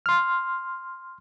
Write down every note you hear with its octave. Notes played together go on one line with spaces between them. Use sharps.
C6 F6